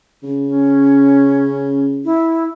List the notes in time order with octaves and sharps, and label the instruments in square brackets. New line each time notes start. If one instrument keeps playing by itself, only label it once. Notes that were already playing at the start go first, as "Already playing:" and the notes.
[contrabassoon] C#3
[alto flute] C#4
E4